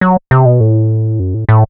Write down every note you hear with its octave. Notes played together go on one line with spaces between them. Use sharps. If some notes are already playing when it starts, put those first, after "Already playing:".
F#3
C3
B2
A2
F#2
A2
A2